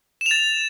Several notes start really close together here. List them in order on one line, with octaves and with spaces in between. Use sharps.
E7 F7 A6